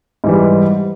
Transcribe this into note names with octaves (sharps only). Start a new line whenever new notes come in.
G#2 E3 G3